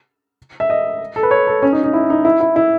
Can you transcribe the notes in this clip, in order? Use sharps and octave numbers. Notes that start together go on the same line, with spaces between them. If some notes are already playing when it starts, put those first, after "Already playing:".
E5
D#5
A4
B4
C#5
A4
C#4
D#4
D#4
E4
D#4
E4
E4
E4